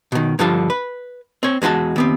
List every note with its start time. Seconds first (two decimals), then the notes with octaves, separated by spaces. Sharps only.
0.12 B2 D#3
0.39 G2 D3 F3 F4 A5
0.70 B4
1.43 C4 C#5
1.62 E2 G#3 F4 F#4 A5
1.96 D#2 B3 C4